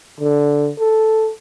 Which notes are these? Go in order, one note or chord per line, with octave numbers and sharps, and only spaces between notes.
D3
A4